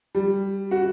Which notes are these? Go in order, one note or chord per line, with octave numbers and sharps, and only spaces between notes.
G3
F#4